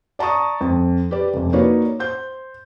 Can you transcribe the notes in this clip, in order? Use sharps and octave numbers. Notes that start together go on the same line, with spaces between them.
D5 A5 A#5 C#6 D#6
F2
G4 B4 D5
F1 F2
A#3 D#4 F#4 B4 C#5 D5
C5 G6